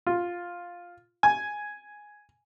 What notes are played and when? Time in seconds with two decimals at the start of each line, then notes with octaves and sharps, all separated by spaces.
0.07 F4
1.23 G#5